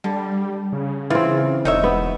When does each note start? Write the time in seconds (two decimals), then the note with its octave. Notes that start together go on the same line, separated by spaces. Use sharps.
0.04 D3 G3
0.72 C#3
1.10 E3 C4 F4
1.65 E1 D#4 C#5 E5
1.84 B3